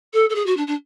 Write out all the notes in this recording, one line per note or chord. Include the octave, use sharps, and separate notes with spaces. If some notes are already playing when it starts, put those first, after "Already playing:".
A4
A4
G#4
F#4
D4
D4